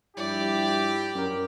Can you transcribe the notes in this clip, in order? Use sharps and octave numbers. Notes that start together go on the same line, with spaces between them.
G2 F3 E4 G4 D5
F#2 A#4